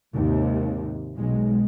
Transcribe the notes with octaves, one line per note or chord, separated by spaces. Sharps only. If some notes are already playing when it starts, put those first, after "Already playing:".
G#1 D#2 C3
B1 G#3